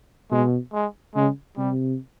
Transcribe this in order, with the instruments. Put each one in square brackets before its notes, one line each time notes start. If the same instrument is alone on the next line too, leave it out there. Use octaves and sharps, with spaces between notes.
[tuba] B2 [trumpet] G#3
[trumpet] G#3
[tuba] C#3 [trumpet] G#3
[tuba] C3 [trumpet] G3